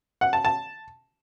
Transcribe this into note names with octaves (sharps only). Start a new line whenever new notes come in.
F#5
A5
A5